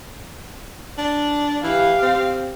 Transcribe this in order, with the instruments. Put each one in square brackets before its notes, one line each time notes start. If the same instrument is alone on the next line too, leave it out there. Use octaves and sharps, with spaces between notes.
[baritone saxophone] D4
[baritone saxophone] E3 [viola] G4 F5
[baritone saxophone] C4